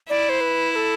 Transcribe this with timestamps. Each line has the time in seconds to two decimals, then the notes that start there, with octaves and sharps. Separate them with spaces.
0.09 E4 D5
0.29 C5
0.41 B4
0.72 B4
0.76 A4